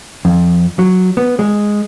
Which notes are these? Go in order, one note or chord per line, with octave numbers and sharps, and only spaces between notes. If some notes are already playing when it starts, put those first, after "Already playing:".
F2
F#3
B3
G#3